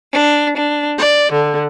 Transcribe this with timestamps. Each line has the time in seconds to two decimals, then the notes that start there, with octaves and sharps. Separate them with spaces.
0.11 D4
0.56 D4
0.98 D5
1.32 D3